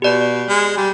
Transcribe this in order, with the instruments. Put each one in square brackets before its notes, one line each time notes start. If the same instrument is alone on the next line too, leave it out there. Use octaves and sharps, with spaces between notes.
[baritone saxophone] B2 [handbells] G4 D5
[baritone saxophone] G#3
G3